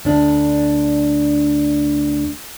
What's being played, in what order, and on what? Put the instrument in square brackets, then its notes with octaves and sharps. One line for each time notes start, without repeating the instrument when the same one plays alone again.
[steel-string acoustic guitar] D2 D4